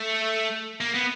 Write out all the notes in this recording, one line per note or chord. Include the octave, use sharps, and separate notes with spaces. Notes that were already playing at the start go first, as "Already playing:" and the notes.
Already playing: A3
A#3
B3